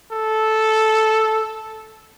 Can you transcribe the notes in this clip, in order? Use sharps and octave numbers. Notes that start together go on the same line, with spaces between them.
A4